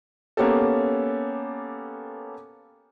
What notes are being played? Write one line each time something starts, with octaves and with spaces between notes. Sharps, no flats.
A#3 B3 C#4 G4 A4